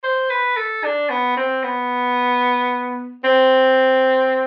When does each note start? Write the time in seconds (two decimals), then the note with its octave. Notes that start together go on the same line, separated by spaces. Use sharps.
0.04 C5
0.30 B4
0.57 A4
0.84 D4
1.10 B3
1.37 C4
1.63 B3
3.24 C4